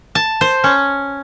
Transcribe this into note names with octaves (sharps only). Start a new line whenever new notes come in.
A5
C5
C#4